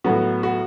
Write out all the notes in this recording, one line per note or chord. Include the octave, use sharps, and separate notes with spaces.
A2 F#3 B3 F#4
F#4